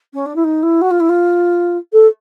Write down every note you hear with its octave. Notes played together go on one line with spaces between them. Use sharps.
C#4
D4
E4
D#4
E4
F#4
F4
E4
F4
A4